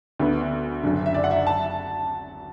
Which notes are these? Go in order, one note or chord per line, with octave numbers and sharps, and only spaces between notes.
D2 D3 B3
F#1 F#2 D3
E5
D5
F#5
E5
A5